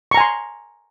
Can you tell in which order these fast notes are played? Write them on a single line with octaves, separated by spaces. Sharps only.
C#6 A#5 G#5 C6